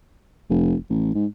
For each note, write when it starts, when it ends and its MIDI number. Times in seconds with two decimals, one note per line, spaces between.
0.50 0.76 29
0.90 1.13 33
1.14 1.26 44